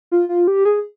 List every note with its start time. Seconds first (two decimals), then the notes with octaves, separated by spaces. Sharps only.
0.12 F4
0.29 F4
0.48 G4
0.65 G#4